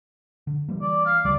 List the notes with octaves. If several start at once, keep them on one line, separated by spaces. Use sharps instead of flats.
D3
E3 G3 A#3
D5
F5
D2 C#3 G3 D5